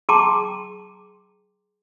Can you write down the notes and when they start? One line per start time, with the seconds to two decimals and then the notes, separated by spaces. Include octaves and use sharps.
0.09 G#4 G5 A5 A#5 C6 D6